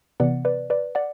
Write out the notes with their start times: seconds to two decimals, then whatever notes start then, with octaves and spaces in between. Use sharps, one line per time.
0.20 C3 E3 B3 D5 F#5
0.45 B4 D5
0.70 B4 D5
0.95 D5 F#5